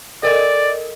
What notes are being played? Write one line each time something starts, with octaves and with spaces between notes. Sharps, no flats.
A4 A#4 D5 D#5